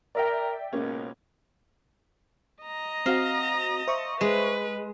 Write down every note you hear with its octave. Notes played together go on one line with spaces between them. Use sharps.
A#4 D5 E5 G5
C#2 G#2 B2 A#3 C#4
D#5 A#5
C4 F#4 F5
C5 E5 C#6
G#3 B4